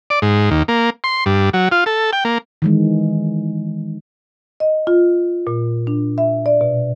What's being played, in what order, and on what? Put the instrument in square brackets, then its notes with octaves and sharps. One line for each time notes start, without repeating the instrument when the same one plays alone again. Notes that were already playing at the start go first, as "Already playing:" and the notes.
[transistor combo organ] D5
G#2
D#2
A#3
C6
G2
F#3
F4
A4
G5
A#3
[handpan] D#3 E3 G#3
[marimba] D#5
F4
A#2
D4
E5
D5
B2